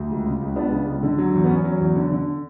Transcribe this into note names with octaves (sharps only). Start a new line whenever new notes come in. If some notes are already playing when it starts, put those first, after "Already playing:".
Already playing: D2
C#2
C#3
C#2
C#2 B3 D4
C#3
C#2
D3
F#3
E2
B3
E2 C#4
F#3
E2
D3
D3